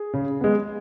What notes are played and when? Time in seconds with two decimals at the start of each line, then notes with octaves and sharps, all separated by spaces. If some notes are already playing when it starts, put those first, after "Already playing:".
Already playing: G#4
0.13 C#3
0.41 G#3 B3